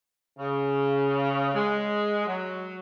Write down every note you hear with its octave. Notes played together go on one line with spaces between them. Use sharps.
C#3
G#3
F#3